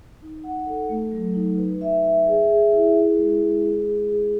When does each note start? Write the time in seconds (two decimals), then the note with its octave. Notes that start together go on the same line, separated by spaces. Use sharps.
0.22 D#4
0.44 F#5
0.66 A4
0.89 A3
1.12 F#3
1.34 D#4
1.58 B4
1.81 E5
2.04 E5
2.27 G#4
2.49 G#4
2.72 E4
2.94 G#4
3.17 G#3
3.40 G#3
3.63 G#4
3.85 G#4
4.09 G#4